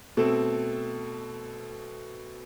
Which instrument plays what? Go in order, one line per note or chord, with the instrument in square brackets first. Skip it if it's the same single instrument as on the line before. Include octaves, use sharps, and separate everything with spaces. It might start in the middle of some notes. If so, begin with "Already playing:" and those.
[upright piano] B2 A3 C4 A4